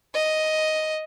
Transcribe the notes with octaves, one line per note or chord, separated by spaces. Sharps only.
D#5